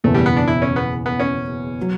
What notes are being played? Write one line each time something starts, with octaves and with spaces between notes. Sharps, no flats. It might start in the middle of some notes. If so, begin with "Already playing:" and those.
F#1 E2 B2 A3
G3
B3
D4
E4
C#4
B3
B3
C#4
F#3